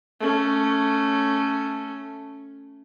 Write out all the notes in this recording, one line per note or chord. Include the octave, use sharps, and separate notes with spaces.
A3 C#4